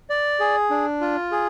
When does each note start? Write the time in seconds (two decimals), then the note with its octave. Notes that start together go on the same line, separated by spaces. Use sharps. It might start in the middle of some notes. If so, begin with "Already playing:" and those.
0.10 D5
0.40 G#4
0.70 D4
1.01 F4
1.31 G#4